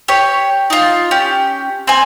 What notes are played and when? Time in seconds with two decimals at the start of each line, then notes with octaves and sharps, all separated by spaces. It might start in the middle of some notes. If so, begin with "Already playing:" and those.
0.08 G4 C#5
0.70 D#4 F4
1.11 C#4 G4
1.87 C4 G#5